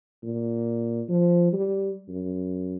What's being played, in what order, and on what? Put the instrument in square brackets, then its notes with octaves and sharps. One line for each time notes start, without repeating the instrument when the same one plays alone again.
[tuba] A#2
F3
G3
F#2